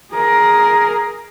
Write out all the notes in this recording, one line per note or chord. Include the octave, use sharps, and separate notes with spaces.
G#4 A#4